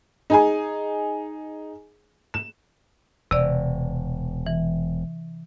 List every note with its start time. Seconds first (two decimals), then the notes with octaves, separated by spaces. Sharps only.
0.30 D#4 G#4 G#5
2.34 E7
3.31 E1 C3 D5
4.46 E3